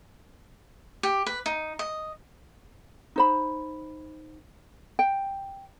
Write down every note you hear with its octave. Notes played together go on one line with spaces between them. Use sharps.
G4
B4
D#4
D#5
D#4 C5 B5
G5